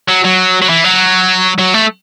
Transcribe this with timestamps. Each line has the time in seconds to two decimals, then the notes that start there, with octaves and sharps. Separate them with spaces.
0.08 F#3
0.24 F#3
0.62 F#3
0.69 E3
0.84 F#3
1.59 F#3
1.74 A3